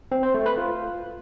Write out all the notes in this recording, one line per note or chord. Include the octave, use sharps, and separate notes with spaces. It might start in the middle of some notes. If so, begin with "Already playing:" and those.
C4
C5
A3
B4
F4